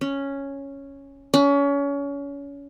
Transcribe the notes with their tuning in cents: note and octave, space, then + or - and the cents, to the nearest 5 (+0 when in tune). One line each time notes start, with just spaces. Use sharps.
C#4 +0
C#4 +30